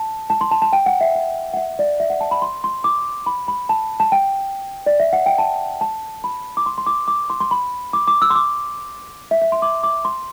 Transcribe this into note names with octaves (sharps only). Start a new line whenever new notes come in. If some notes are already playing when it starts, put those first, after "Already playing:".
Already playing: A5
A5
C6
A5
A5
G5
F#5
E5
F#5
F#5
E5
D5
E5
F#5
A5
B5
C6
C6
D6
B5
B5
A5
A5
G5
D5
E5
F#5
G5
A5
A5
B5
D6
C6
C6
D6
D6
C6
C6
B5
D6
D6
E6
C6
D6
E5
E5
C6
D6
D6
C6